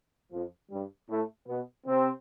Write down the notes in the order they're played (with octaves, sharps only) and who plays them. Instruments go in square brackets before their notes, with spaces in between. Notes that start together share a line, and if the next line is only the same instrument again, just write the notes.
[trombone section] F2 F3
G2 G3
A2 A3
B2 B3
C3 C4